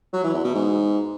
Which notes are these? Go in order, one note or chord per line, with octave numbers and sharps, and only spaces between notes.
F#3
E3
E2
B2
G#2